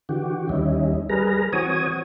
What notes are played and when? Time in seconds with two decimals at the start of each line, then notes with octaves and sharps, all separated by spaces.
0.09 D3 E3 F#4 G4
0.49 D#2 G3 C#4 D#4 E4
1.09 G3 G#4 A#4 B4 A#5
1.53 E3 C4 F#4 C#5 G#5 D#6